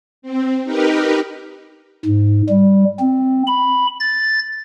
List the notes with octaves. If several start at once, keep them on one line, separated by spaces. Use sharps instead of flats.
C4
D#4 G4 A#4 B4
G#2
G3
C4
B5
A6